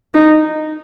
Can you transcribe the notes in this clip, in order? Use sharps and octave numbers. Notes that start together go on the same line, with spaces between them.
D#4